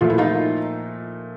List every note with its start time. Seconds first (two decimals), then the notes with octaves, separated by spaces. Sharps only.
0.01 A#2 F3 A3 F4
0.10 E4
0.18 D#4 F4